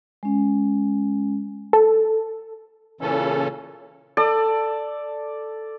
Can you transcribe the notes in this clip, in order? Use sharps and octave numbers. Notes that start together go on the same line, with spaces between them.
G#3 C#4
A4
A#2 C#3 E3 C#4 A4
A4 D5